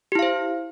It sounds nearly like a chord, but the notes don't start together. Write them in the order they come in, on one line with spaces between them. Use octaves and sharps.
G4 E4 F5 C5